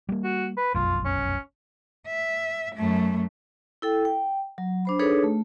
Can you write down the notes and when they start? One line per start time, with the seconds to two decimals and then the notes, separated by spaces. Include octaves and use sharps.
0.09 G3 G#3 A#3
0.24 F#4
0.57 B4
0.74 F1 B1 F#2 F4
1.05 C#4
2.07 E5
2.75 F#2 A3
3.82 E4 A4 G5
4.05 G5
4.58 F#3
4.85 D4 C5 B5
4.99 D4 D#4 G#4 A4 B4 C#5
5.24 A3